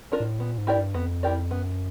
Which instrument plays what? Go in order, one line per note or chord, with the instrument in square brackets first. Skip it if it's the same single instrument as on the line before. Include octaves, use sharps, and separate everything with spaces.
[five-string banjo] D4 F4 A#4
[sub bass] A2
[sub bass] A#2 [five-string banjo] B3
[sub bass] G#2
[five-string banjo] E4 G4 A#4 D5
[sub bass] G2
[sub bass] F2 [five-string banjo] B3
[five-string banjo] E4 G4 A#4 D5
[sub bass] F#2 [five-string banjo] B3